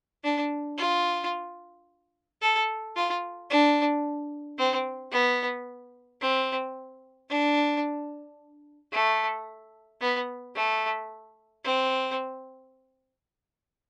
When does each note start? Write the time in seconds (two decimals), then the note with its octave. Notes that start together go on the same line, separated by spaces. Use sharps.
0.24 D4
0.78 F4
2.42 A4
2.96 F4
3.50 D4
4.59 C4
5.12 B3
6.21 C4
7.30 D4
8.92 A3
10.01 B3
10.55 A3
11.64 C4